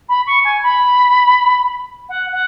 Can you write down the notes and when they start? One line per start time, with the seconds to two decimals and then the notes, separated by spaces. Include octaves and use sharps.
0.08 B5
0.26 C#6
0.44 G#5
0.63 B5
2.09 F#5
2.32 F#5